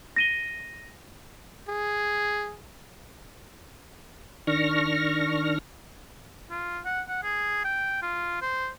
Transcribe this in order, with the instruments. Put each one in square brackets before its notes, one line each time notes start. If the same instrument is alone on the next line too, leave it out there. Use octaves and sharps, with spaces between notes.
[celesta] A#6 D#7 G7
[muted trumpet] G#4
[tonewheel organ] D#3 D4 C#6 F6 A#6
[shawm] F4
F#5
F#5
G#4
G5
F4
C5